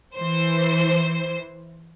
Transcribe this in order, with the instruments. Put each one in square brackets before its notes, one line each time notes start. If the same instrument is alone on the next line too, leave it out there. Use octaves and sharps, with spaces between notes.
[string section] E3 C5